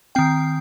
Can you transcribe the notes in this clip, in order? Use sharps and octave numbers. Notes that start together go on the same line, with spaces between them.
D#3 C4 G5